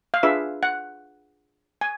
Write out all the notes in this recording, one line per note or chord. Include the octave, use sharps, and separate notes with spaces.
F5
D4 F4 G#4 B4 E5
F#5
G#5